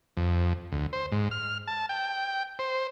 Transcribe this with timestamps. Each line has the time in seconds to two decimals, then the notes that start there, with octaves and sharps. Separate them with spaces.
0.17 F2
0.72 D2
0.93 C5
1.12 G#2
1.31 F6
1.67 A5
1.89 G5
2.59 C5